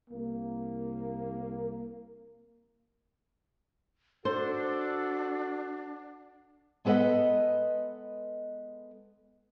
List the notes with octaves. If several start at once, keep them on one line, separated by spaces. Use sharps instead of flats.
C2 A#3
D4 F#4 A4 C5
G#3 B3 A4 B4 D#5 F#5